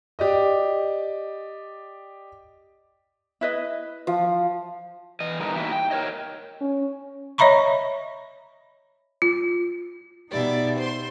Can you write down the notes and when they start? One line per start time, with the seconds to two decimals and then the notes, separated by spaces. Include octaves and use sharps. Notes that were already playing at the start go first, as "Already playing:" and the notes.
0.19 G4 D5 D#5
3.41 E4 B4 D#5
4.07 F3
5.20 E3 D#5
5.40 D3 E3 G3 B3 D#4 A#4
5.56 A#3 D#4 E4 F#4 G4 E5
5.72 G5
5.91 A#4 B4 C#5 D#5
6.61 C#4
7.38 C#5 D#5 E5 A#5 B5 C#6
9.22 F4
10.30 B2 D#4 G4 D5 E5
10.75 C5 C6